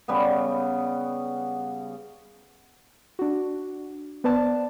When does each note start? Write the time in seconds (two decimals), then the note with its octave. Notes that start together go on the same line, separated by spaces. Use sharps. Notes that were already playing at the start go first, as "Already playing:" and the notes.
0.08 C#3 G3 B3
3.19 D4 F#4
4.24 B3 B4 C5 D5 A5